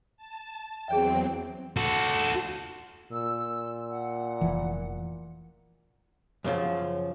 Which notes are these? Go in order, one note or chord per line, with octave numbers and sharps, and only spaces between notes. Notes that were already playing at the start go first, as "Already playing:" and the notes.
A5
E2 F#3 C4 G#4 C#5 E5 G5
F#4 A4
A#2 E6
F#5
F1 E3
F#2 C#3 F3